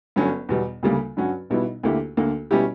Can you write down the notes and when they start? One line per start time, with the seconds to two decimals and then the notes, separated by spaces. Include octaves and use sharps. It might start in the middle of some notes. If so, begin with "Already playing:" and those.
0.16 G1 G2 F#3 C#4
0.49 E2 B2 G3
0.83 D2 C#3 G3 A#3
1.17 G2 F#3 C#4 F#4
1.50 B1 B2 G3 B3 E4
1.83 D2 D3 A#3 E4 G4
2.17 D2 D3 A#3
2.51 B2 G3 C#4 E4 G4